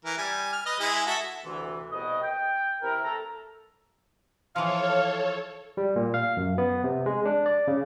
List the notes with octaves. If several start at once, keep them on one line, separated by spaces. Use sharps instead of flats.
E3 A#4
G3 G#5
F6
B4 D#5
G#3 E4 G#4
F#4 A4 E5
D2 C3 E3
C2 B2 D#5
G5
C3 E4 A#4
A4 A#5
E3 F3 A4 C#5 F5
G3
A#2
F5
F#2
B3
C3
G#3
D4
D5
C#3